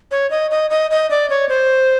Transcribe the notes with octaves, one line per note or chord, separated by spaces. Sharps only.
C#5
D#5
D#5
D#5
D#5
D5
C#5
C5